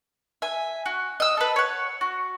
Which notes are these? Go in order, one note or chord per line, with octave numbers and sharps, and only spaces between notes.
E5 G#5
F#4
D#5 E6
A4 B4
C#5 F#5
F#4